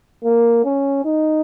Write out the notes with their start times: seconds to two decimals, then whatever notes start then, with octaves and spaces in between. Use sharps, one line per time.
0.25 A#3
0.65 C#4
1.05 D#4